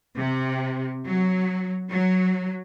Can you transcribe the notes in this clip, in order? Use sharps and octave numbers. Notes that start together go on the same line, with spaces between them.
C3
F#3
F#3